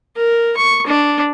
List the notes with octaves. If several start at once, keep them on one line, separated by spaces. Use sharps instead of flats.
A#4
C#6
D4